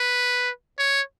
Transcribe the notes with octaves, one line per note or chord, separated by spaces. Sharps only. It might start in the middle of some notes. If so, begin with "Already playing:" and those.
Already playing: B4
C#5